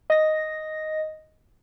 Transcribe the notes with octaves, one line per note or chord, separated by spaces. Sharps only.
D#5 A#6